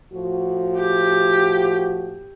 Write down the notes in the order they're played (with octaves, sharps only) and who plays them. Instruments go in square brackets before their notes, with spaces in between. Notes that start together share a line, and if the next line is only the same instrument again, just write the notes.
[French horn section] A2 F3 F#4
[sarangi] G4